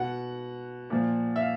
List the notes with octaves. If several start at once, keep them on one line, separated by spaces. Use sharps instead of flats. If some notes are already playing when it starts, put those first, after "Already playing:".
Already playing: B2 F#5
A#2 F3
E5
F5